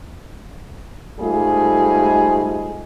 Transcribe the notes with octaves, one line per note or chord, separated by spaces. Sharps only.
G#2 G3 A3 F4 G#4